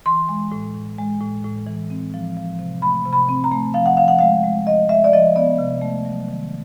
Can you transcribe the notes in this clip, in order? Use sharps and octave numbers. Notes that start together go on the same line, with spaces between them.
E3 C6
G#3
A2
A2
G#3
A2
A2
E3
C4
F3
F3
C3
A3 B5
C3
B5
C4
A#5
A3
F3 F5
F#5
F3 F5
F#5
G#3 F5
G#3
F3 D#5
G#3 E5
D5
F3 D#5
B3 D5
C3
A3
F#3
D#3